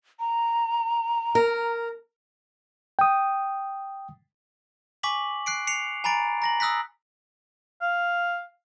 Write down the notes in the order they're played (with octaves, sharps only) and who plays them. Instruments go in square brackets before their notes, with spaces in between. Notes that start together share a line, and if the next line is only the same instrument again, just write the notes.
[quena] A#5
[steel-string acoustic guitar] A#4
[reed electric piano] G5 D#6
[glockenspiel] G#5 C#6 D6 B6 F#7
F#6 C7 D7
C7 C#7 F7
G#5 A#5 B5 A6 D7
A#5 A#6 F#7
D#6 E6 F#6 A#6 B6
[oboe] F5